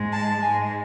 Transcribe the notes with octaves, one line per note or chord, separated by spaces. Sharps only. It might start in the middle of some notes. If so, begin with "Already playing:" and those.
Already playing: G#2 G#3
A5
G#2 G#3 G#5